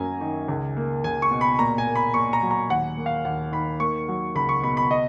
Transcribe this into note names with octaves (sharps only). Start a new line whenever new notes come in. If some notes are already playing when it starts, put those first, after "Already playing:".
Already playing: F#2 F#3 A#3 G#5 A#5
D#3
C#2
A#3
C#2 G#5
C#6
B2
B5
A#2 A#5
G#5
A#3
B5
A#2 C#6
A#5
F#3
A#5
D#2 F#5
A#3
F5
D#2 F#5
D#3 B5
A#3 C#6
F#3
C#2 B5
C#6
B2 B5
B5
D#5